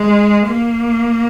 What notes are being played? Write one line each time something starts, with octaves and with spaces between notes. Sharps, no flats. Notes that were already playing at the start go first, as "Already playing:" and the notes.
Already playing: G#3
A#3